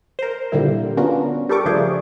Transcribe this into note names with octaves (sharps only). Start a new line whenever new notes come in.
A#4 C5
A#2 D3 G3 A#3 E4
B3 C#4 D4 F4 F#4 A#4
G3 G4 A4 A#4 C#6 D6
C#3 F3 A3 D4 G#4 C5